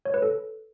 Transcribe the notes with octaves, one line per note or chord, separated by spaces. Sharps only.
C#5
B4
A4